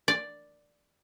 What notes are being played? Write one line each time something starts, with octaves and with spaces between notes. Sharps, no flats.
D5